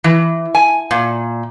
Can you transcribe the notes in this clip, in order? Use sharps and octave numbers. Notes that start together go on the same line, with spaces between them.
E3
G#5
A#2